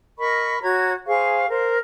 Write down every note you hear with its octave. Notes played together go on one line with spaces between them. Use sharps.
A#4 D#5 B5 C#6
F#4 C#5 A#5 G#6
G#4 C5 F5 C#6
A#4 C5